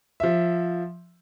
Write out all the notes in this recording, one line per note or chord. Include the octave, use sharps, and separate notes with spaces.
F3 E5